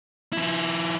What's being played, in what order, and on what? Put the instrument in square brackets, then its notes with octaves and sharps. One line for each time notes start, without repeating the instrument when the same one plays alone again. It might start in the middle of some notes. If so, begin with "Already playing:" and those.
[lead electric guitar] F3 E4